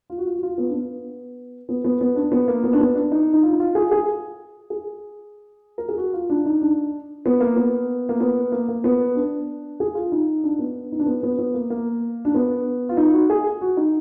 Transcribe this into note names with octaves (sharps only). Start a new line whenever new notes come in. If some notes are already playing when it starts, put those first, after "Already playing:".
F4
F#4
F4
F#4
F4
B3
D4
B3
B3
B3
B3
D4
B3
A#3
B3
D4
B3
D4
D#4
D#4
F4
D#4
F4
G#4
G#4
G#4
A#4
G#4
F#4
F4
D4
D#4
D4
B3
A#3
B3
A#3
B3
A#3
A#3
B3
D4
G#4
F4
D#4
D4
B3
D#4
D4
B3
B3
B3
A#3
A#3
D4
B3
F4
D#4
F#4
G#4
F#4
D#4